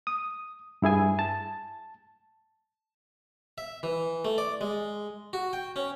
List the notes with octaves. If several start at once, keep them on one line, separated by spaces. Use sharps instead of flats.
D#6
G2 E4 G#4 G#5
A5
E5
E3
A3
D5
G#3
F#4
G5
C#4